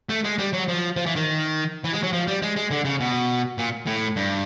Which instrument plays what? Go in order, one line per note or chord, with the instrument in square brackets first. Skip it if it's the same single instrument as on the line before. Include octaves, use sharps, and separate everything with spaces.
[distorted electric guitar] A3
G#3
G3
F#3
F3
F3
E3
D#3
E3
G#3
F#3
F3
G3
G#3
G#3
D3
C#3
B2
A#2
A2
G2